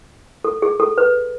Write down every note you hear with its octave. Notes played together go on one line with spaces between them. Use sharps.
A4
G#4
A4
B4